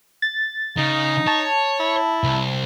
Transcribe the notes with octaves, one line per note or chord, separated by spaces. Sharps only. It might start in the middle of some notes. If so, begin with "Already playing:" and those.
A6
C#3 D#4
C#5 A5
E4
C2